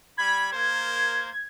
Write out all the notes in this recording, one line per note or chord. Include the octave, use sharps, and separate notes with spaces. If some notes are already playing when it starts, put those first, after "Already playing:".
G3 B5 G#6
A#3 A#4 C5